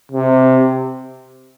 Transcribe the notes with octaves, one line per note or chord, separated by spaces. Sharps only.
C3